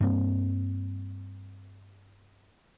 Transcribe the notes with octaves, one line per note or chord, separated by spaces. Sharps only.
G2 A#3 C4